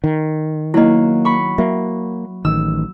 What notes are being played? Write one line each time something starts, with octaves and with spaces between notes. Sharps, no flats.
D#3
F#3 A#3 E4 D#5
B5 C#6
F#3 A#3 E5
A1 D#3 E6